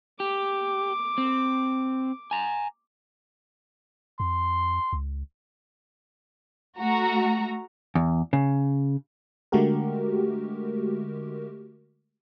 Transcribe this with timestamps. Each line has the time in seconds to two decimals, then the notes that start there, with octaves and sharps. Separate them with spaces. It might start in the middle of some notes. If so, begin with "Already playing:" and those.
0.20 G4 D6
1.18 C4
2.31 G#5 A#5
4.20 F2 C6
4.93 C#2
6.78 A3 F#4 A#5
7.95 E2
8.33 C#3
9.52 D3 G#3 A3 F#4 G4 A#4